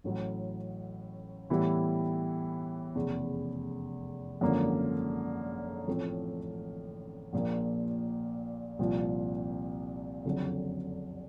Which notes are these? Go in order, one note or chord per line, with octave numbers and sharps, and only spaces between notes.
A1 A2 F#3
A2 E3 G3 B3 E4
F1 E2 C#3
G#1 F#2 D3 F3 A#3
A1 A2 F3 A3 C4
A#1 A#2 F3 A#3
C2 A#2 F3
F#1 F2 D3 F#3